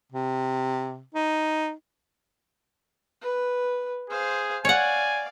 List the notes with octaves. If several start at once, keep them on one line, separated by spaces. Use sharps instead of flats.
C3
D#4
B4
G#4 C5 F5
C#5 D5 F5 F#5 G#5